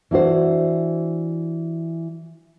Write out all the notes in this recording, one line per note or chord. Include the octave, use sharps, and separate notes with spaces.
E3 D4 F#4 C5